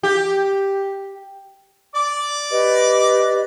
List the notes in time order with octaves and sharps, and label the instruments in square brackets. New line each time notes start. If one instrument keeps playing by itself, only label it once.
[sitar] G4
[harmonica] D5 D6
[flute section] G4 B4 D#5